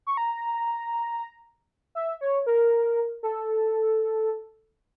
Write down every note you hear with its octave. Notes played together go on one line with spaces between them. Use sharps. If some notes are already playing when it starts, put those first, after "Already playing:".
C#6
A#5
E5
C#5
A#4
A4